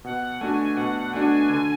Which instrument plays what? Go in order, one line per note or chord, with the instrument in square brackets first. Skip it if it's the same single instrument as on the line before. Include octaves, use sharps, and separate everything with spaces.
[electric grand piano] B2 [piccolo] F#5
[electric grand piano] A3 D4 F#4 [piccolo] G#5
[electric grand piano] B2 [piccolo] F#5
[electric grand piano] A3 D4 F#4 [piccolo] G#5
[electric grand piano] D3